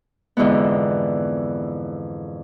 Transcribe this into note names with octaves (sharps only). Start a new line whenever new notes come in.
F2 G#2 D3 E3 G#3 B3